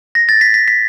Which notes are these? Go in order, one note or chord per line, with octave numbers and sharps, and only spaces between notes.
A#6
A6
B6
B6
B6